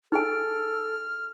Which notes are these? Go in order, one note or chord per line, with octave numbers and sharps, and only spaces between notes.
D#4 G#4 A4 G#5 F6